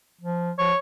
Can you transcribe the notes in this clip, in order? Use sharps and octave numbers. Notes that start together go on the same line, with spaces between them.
F3
F3 C#5